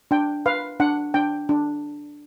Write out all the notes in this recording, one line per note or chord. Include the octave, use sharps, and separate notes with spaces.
D4 G5
B4 F5
D4 F#5
D4 G5
D4